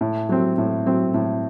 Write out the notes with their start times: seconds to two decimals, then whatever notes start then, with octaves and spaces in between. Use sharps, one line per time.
0.01 A2
0.29 F#3 C4
0.58 A2
0.86 F#3 C4
1.14 A2